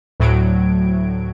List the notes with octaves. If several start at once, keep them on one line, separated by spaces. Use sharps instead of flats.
D2 A2 F#3 G#6 D7